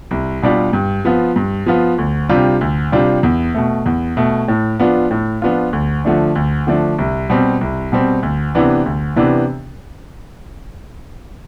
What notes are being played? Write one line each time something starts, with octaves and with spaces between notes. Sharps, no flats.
C2
B2 G3 D4 F4
G2
F3 B3 F4
G2
F3 B3 F4
D2
C3 G3 D4 F4
D2
C3 G3 D4 F4
E2
B2 A3
E2
B2 A3
A2
F3 B3 D4 F4
A2
F3 B3 D4 F4
D2
D3 F3 A3 D4
D2
D3 F3 A3 D4
C2
B2 G3 C4
C2
B2 G3 C4
D2
C3 E3 B3 D4
D2
C3 E3 B3 D4